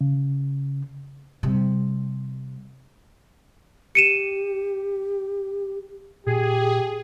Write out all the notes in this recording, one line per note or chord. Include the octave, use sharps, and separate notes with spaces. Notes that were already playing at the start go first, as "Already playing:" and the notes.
C#3
C3 G3
G4 C#7 D#7 E7
A#2 G4 G#4